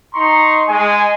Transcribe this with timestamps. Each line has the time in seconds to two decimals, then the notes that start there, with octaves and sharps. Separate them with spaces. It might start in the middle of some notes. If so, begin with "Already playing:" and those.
0.14 D#4 A#5 C6 C#6
0.68 G#3 G#5